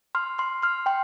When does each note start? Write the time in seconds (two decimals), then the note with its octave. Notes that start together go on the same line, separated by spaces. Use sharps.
0.15 C6 F6
0.38 C6 F6
0.63 C6 F6
0.86 G5 C6